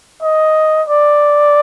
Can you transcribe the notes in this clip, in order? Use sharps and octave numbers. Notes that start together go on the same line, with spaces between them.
D#5
D5